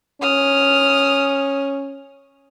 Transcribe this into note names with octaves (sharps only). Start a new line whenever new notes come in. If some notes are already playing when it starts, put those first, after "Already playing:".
C#4 D#6 F6